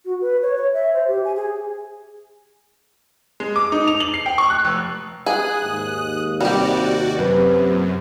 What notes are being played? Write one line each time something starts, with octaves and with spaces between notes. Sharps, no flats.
F#4
B4
C#5
C#5
E5
C5
G4
G#5
G#4
G#3
D6
D#4
F7
F#7
C7
G5
C#6
F#6
F1
G#4 D#6 F#6
D#2 G#2
C3 G3 F#4 G4 D5
F#2 C3 B4
A#2